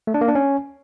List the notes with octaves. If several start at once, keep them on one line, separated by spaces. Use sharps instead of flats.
A3
D4
A#3
D4
C#4